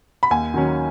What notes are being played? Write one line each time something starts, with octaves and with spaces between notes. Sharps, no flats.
B5
D#2 G#5
D#3 F#3 C#4